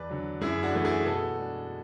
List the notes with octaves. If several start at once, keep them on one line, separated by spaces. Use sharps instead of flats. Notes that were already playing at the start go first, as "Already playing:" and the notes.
Already playing: E2 B4 D5
D3 F#3
F#2 E4 G#4
D4 F#4
E3 A3 D4
E4 G#4
B2 F#4 A4
G#3 D4